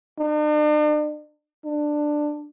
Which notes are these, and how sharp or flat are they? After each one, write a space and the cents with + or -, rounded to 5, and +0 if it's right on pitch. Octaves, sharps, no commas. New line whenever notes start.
D4 +45
D4 +10